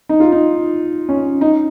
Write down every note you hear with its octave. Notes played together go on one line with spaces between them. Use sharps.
D#4
F4
D#4
C#4
D#4